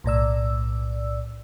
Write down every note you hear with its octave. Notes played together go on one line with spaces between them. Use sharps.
B1 A2 D5 E6